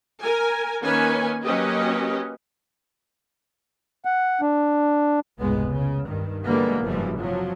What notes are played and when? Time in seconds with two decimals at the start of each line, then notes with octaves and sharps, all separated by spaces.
0.21 A#4 G#5
0.82 D#3 A#3 C#4 B4 G#5
1.43 F#3 A#3 C#4 G4 B4 D#5
4.05 F#5
4.41 D4
5.39 F1 C#2 G#2 G#3 B3
5.69 C#3
6.04 G2 D#3
6.46 D3 E3 G3 G#3 A#3 B3
6.83 F#1 G#2 E3 F3 G3
7.19 C3 F3 F#3